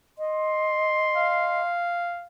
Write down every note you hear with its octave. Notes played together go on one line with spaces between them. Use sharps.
D#5 C6
F5